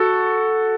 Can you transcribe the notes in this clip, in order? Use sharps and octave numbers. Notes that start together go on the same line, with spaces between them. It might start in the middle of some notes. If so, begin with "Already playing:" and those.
Already playing: F#4 A4